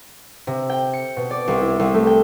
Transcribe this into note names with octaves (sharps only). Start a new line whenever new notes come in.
C3
G5
C#7
B2
D5
C2
E4
C2
A3
G5